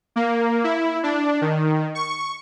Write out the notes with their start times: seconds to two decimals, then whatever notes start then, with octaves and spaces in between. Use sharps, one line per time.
0.16 A#3
0.64 E4
1.03 D4
1.41 D#3
1.95 C#6